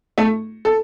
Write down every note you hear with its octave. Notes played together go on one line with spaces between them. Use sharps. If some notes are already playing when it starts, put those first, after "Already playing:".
A3 A4
A4